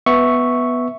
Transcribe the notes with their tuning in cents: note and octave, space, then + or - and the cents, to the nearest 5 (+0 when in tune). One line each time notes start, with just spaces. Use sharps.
B3 +0 E5 +0 C#6 +0